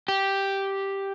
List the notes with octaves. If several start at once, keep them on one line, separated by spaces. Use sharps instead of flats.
G4